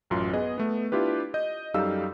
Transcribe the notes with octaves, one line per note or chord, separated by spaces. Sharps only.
A1 F#2 F4 C6
B3 G#4 D#5
A3 B3
D4 E4 F4 G4 B4
D#5 G6
F#2 G3 D#4 A4 F5 E6